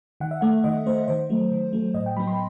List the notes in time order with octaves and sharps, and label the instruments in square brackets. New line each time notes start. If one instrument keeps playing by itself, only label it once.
[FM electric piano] D#3 F#5
E5
A3 F#5
D#3 D#5
A3 C5
D#3 C5
F#3 A3
D#3
F#3 A3
A2 D#5
G5
F#3 B3 B5
C6